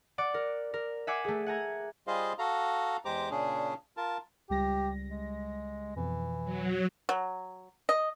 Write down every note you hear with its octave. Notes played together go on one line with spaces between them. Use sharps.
D5 F#5 D6
A#4
A#4
E5 F#5 G#5 D6 E6 C7
A3 G#4
F#5 G#5 A#5 G#6
G3 F4 G#4 C5 D#5 F5
F#4 A4 F5 A#5
E2 G#3 G4 C5 A#5 D6
A#2 C#3 C#4 D4 G#4
F4 A#4 A5
C#2 G3 G4 A#6
G#3
F2 B2 E3
F#3
F#3
D#5